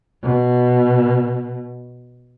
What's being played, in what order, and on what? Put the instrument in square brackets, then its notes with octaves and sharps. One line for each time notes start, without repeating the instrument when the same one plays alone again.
[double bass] B2